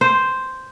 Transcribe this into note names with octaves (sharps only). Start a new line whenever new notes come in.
C5